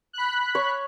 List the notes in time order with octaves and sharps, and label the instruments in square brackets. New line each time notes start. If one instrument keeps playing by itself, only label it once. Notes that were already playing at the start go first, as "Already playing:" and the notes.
[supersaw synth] B5 F#6
[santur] C#5